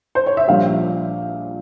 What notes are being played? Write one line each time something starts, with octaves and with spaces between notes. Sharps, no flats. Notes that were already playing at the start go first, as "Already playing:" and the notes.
C5
C#5
E5
A#1 A#2 G3 F5